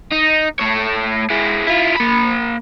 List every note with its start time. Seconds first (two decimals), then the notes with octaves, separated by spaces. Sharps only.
0.12 D#4
0.59 A3 C#5
1.30 G#3 E4
1.67 E4 F4
1.96 A#3 B5